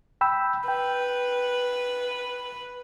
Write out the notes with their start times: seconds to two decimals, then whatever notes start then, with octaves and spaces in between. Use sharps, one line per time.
0.21 G5 B5 E6
0.68 B4 G5